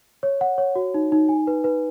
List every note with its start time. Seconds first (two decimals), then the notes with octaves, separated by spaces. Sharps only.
0.23 C#5
0.41 F#5
0.58 C#5
0.75 F#4
0.94 D#4
1.12 D#4
1.29 G#5
1.47 B4
1.64 B4